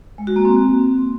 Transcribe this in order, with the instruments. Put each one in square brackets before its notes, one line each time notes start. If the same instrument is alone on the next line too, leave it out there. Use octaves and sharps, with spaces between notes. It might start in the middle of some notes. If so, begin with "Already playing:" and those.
[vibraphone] G#3
F#4
A#3
C4